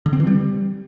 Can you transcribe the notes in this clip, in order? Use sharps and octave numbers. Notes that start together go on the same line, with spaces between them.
D3
C4
E3
G3